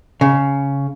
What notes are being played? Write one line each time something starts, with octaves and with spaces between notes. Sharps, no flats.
C#3